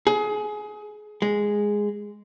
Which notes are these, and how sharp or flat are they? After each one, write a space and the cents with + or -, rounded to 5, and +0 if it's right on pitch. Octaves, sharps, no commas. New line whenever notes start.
G#4 +25
G#3 -5